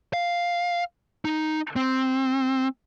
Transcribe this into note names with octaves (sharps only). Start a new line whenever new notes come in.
F5
D#4
C4